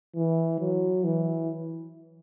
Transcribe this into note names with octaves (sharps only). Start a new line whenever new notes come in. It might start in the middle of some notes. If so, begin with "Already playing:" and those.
E3
F#3
E3